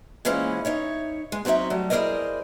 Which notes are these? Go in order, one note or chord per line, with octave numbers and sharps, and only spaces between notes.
A#2 E3 F3 G#3 C#4 E4
D#4 C#5 E5
G#3
F#3 C4 C#4 D#4 E5
F#3 G3 A3
E4 G#4 A#4 C5 D5 D#5